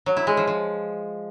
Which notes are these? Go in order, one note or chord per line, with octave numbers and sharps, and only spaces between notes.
F#3
E4
G#3
F3
F3